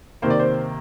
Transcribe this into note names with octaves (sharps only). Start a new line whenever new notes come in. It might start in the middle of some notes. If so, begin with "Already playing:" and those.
C3 D#3 A#3 C5
D5
C5